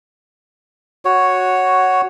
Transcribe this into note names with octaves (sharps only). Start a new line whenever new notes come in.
F#4 C#5